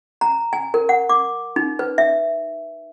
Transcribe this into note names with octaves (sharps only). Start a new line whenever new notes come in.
A#5
G#5
A#4
F#5
D6
D#4
B4
E5